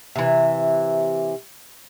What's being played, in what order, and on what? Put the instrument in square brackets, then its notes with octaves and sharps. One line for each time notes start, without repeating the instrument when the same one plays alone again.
[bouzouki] C3 E3